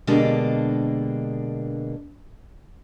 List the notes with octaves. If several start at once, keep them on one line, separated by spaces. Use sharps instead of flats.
B2 D3 G#3 A#3 D4 G4